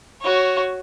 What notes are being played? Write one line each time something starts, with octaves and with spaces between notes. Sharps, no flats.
F#4 C#5